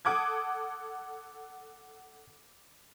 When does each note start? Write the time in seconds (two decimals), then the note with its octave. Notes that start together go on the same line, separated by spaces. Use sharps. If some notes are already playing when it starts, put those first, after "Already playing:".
0.05 A4 F#5 D6 D#6 G#6